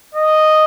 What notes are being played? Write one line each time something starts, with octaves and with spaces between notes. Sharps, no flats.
D#5